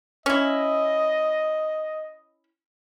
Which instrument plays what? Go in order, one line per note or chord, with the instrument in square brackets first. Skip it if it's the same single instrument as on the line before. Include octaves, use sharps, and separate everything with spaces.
[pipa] C#4 E4 [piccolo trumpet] D#5